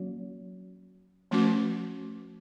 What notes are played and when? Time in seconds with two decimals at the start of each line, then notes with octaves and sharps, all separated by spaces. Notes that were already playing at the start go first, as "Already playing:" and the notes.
Already playing: F#3 A#3 C#4 F#4
1.31 F3 A3 C#4 F#4 B4